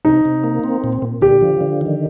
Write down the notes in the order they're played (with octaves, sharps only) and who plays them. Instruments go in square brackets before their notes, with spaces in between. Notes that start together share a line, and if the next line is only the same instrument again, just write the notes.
[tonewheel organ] C3 [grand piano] D#4
[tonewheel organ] C3
A#3
C4
A#2
A#2
[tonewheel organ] D3 [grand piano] G4
[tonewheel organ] F3
D3
D#3